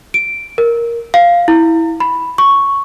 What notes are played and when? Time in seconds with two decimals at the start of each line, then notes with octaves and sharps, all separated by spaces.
0.14 D7
0.58 A#4
1.14 F5
1.48 E4
2.00 B5
2.38 C#6